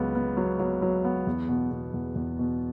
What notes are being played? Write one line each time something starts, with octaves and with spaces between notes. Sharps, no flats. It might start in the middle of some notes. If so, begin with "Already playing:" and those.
Already playing: C#2 F#3 B3
B3
F#3
F#3
F#3
B3
E2
B2
B2
E2
E2
B2